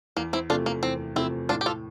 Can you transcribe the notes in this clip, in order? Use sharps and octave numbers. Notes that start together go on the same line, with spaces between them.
E2 A#3
C4 E4
C3 F3 A3 D4 F4
A#3
E2 C4
C3 F3 A3 C4 E4
A2 D4 F4
G4
F4 A4